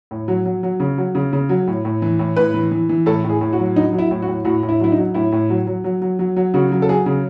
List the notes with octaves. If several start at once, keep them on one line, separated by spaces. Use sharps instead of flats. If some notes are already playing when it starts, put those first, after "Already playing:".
A2
F#3
F#3
F#3
C#3
F#3
C#3
C#3
F#3
A2
A2
E3
A2
A2 B4
E3
E3
E3
A2 A4
A2
G#4
A2
F#4
F#3
F#3 D#4
F#3
E4
A2
F#4
A2
A2 F#4
A2
E4
F#3 E4
D#4
F#3
A2 E4
A2
F#3
F#3
F#3
F#3
F#3
F#3
C#3 F#4
F#3
A4
F#3 G#4
C#3